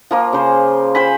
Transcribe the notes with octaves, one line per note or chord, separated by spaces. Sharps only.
F3 A#3 F4
C#3 C5
C5 G5 G#5 B5